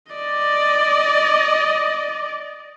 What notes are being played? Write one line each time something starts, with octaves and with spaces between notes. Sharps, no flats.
D5 D#5